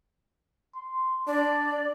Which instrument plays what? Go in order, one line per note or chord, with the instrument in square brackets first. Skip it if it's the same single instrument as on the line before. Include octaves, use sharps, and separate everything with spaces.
[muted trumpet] C6
[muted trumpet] D4 [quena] D5